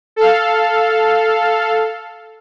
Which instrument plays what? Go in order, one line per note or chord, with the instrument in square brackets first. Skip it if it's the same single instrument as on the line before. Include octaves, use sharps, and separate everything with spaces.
[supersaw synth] A4 F5